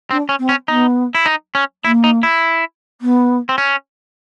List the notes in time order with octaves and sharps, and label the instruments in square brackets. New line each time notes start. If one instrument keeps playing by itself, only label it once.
[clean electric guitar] C4 [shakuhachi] D4
[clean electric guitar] C#4
[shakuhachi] C4
[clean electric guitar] C#4
[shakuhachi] B3 [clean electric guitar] D#4
[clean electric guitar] E4
D#4
C#4
[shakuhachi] A#3 [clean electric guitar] E4
[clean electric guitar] D#4
E4
[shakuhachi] B3
[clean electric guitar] C4
C#4